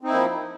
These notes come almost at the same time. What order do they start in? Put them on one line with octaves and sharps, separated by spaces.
C4 D#4 E4 A#3 F3